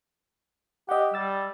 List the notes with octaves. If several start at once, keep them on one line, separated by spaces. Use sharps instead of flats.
G4 D#5 F#5
G3 E6 A6